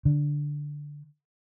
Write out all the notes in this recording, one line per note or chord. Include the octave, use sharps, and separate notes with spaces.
D3